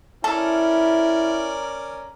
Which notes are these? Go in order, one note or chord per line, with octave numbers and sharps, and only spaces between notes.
C#4 E4 A4 A#4 D5